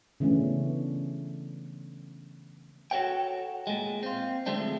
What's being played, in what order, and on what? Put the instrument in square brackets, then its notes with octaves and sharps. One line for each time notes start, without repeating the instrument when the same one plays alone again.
[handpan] C#3 E3 A3 B3 C#4 D4
[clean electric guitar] F#4 A4 A#4 C#5 F#5 G5
A#2 G#3
C4 F4
D2 F3 G#3 A3 C4 D4